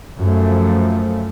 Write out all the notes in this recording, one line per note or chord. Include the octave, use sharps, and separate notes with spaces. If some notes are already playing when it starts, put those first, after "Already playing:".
F#2 F3 A3